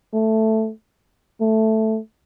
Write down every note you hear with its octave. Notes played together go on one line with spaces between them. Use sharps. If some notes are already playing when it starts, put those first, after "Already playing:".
A3
A3